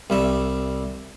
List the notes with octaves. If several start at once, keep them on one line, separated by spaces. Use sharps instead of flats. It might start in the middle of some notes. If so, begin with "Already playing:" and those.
C2 G3 E5